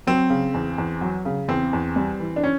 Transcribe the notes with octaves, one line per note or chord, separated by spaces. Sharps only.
F#3 C4
C#3
E2
E2
F#3
C#3
E2 C4
E2
G3
E3
D4
C#4